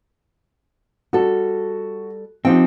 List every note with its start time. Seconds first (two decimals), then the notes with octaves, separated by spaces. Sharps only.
1.13 G3 F#4 A4
2.45 F3 C4 D#4 G4 F#5 G5